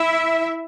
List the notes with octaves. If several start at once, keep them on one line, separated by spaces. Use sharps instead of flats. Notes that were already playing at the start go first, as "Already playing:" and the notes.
Already playing: E4 E5